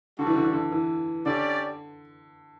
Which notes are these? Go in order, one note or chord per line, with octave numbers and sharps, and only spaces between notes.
D3 G3 D4 F#4
E3
D3
E3
D3
E3
D3 C#4 G4 D5